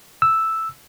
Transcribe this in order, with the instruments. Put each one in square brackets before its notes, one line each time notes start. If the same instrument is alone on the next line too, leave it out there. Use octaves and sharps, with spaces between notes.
[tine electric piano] E6